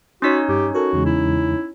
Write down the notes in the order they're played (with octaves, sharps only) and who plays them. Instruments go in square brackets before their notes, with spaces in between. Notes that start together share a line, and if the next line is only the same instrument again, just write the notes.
[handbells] C#4 D#4 C#5 [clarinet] F#4 [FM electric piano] C6 A6 B6
[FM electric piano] G2 [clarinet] G4
[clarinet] F#4 [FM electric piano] A4 A#4
[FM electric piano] E2 C#3 G#3
[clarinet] E4